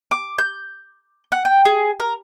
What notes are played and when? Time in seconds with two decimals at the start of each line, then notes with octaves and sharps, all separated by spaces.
0.11 D6
0.38 G6
1.32 F#5
1.45 G5
1.65 G#4
2.00 A#4